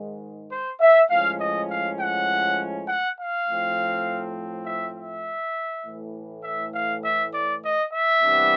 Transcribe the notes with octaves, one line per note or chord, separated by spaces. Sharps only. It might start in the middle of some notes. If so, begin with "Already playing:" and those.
Already playing: G#2 D#3 G#3
C5
E5
A2 F3 G#3 C#4 F5
D#5
F5
F#5
F#5
F5
A2 F3 A3 C4
E5
E5
A2 E3 A3
E5
F5
E5
D5
D#5
E5
C3 E3 G3 B3 D4